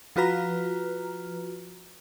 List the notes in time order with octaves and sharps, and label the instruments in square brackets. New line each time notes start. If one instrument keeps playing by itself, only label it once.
[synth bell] F3 F4 F#4 B4 A#5 F6